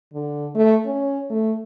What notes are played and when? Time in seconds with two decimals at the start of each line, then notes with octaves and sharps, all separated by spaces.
0.13 D3
0.55 A3
0.86 C#4
1.30 A3